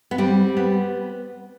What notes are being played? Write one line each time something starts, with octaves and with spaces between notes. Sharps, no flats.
B3
G3 C4
B3